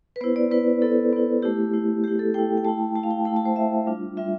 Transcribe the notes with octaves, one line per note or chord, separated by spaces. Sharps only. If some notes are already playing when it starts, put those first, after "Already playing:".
B4
B3 E4 C5
D5
B3 E4 B4
B3 E4 A4
B3 E4
A3 E4 G4
A3 E4
A3 E4 G4
A4
A3 E4 G5
G5
A3 E4 A5
A3 E4 A5
F5
G5
A3 E4 A5
A5
C5
A3 E4 E5
G3 D4 F4
G3 D4 F4 E5